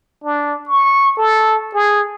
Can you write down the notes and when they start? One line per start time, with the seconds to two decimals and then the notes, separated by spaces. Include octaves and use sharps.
0.24 D4
0.68 C#6
1.17 A4
1.74 G#4